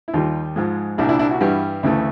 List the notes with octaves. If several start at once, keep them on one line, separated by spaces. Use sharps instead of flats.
E4
D#2 D#3 G3 D#4 F4
G#2 F3 G#3
C2 A#2 G3 D4 E4
D4 E4
D4 E4
E4 F#4
G2 E3 G3
D2 C#3 E3 A3